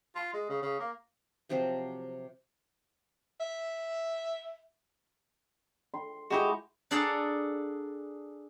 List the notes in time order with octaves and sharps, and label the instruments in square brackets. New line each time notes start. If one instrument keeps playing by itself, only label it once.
[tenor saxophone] F4
G#3
C#3
C#3
A#3
[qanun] C3 F3 F#3 C4
[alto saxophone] E5
[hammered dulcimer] C6
[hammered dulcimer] G#3 E4 [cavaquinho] F#4 G4 D#5
[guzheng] D4 G#4 A4 D5 F#5 A#5